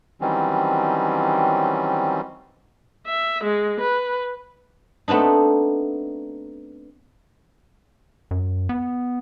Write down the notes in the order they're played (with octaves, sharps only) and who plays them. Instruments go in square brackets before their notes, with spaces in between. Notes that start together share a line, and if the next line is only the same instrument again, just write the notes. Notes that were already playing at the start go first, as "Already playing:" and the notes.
[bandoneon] D#3 E3 F#3 G3 C4 C#4
[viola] E5
G#3
B4
[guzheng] A3 B3 C4 D4 D#4
[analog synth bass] F#2
B3